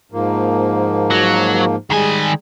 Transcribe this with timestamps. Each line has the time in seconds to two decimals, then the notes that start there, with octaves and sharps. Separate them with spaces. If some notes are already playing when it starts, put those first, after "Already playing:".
0.12 G#2 F3 A#3
1.11 F#3
1.91 D#3 G3 G#3 G#4 G#5